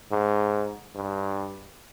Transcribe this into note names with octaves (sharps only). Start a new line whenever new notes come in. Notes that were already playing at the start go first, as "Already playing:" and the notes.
G#2
G2